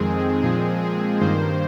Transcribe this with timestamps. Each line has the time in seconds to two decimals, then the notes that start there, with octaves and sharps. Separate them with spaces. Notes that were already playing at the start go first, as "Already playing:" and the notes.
Already playing: F2 D#3 G#3 C4 G#4
0.42 A#2 F3 G#3 C4 G#4
0.82 G#4
1.20 G2 D#3 A#3 C5